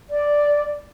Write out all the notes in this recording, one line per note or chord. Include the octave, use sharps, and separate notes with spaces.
D5